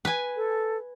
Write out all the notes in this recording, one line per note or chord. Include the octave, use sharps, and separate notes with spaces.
B4 G#5
A4